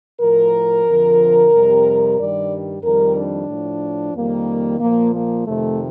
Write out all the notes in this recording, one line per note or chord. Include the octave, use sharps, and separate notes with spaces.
A2 F3 A#4
F2 D3 F3
F2 C3 G3
G2 D#3 G3 D5
F2 D#3 G3 A#4
D4
A2 F3
F2 D#3 G3 A#3
A#2 F3 A#3
A#3
F2 C3 D#3 A3